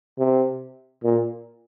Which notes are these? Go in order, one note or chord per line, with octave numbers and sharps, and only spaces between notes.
C3
A#2